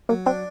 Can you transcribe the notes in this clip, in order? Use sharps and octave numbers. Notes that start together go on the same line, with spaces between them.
F#3 A#3
C4 D4